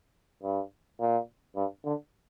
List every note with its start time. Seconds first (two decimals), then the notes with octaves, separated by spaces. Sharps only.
0.43 G2
1.00 A#2
1.56 G2
1.85 D3